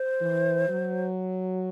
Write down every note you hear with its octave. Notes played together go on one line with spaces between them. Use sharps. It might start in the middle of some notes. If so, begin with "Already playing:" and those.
Already playing: C5
E3
F#3